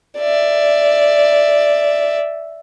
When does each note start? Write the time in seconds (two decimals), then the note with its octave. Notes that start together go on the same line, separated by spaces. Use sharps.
0.19 D5 E5